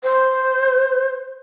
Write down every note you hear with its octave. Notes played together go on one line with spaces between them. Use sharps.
C5